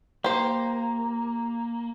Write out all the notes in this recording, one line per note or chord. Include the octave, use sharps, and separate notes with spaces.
A#3 G4 C5